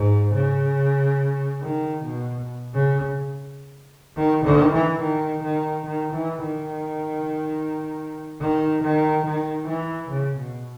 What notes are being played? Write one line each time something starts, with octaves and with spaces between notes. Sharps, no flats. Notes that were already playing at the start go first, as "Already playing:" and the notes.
Already playing: G#2
C#3
D#3
B2
C#3
D#3
D#3
E3
D#3
D#3
D#3
E3
D#3
D#3
D#3
D#3
E3
C#3
B2